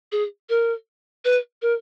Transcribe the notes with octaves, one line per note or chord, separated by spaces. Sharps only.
G#4
A#4
B4
A#4